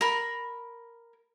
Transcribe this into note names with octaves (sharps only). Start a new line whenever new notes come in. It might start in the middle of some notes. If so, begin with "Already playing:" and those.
A#4 B5